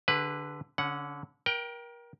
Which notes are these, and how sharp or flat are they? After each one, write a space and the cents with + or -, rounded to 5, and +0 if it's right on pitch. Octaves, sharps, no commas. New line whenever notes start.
D3 +0 G#4 -40 B4 +0
D3 -25 C#4 +0 F#5 +0
A#4 +30 G5 -5